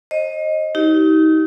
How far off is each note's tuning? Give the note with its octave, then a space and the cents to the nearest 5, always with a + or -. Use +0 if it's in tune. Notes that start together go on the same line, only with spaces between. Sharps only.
C5 +40 D#5 +0
D#4 +30 G4 -30